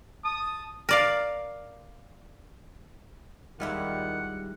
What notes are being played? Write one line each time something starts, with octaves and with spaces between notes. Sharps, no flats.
A5 D#6
A#4 D5 F5
D#2 D#3 G3 G#3 E4 F4 F#5